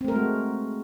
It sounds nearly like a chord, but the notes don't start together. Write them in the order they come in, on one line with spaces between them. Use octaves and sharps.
C4 A3 A#4 G#3 F#4